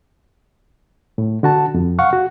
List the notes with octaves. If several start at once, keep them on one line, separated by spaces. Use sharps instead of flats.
A2
D3 F#4 A5
F2
F5 F#5 C#6
F#4